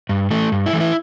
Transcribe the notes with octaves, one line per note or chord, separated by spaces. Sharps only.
G2
E3 A3
G2
E4
E3 A3
E4